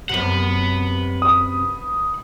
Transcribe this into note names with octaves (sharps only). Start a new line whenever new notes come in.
F#2 C3 B4 F#5
D#6